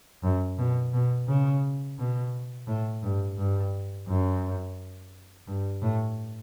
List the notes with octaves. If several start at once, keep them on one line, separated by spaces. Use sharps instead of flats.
F#2
B2
B2
C#3
B2
A2
G2
G2
F#2
G2
A2